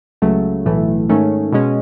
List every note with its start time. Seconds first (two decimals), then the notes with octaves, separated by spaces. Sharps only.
0.22 C#2 C#3 F#3 A3
0.66 B1 A2 E3 A3
1.09 G#2 D#3 A3 C#4
1.52 B2 G#3 C#4